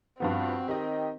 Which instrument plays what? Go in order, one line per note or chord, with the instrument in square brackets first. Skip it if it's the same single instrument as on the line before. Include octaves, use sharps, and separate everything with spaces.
[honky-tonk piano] G2 F3 B3 [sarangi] C4 [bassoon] F#4
[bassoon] D#3 [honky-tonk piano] G4 D#5